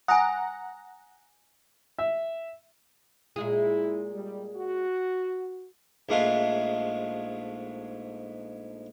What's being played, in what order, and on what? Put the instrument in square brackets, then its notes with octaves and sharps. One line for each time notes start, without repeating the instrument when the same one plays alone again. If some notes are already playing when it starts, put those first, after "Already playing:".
[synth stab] F#5 A#5 [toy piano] G#5 D#6
[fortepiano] E5
[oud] A#2 G#3 G#4 [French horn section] E4
[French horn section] G3
F#4
[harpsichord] A#1 G#2 G#3 A3 F5 C6